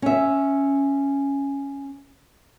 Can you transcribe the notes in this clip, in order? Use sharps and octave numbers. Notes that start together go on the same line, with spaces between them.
C#4 E5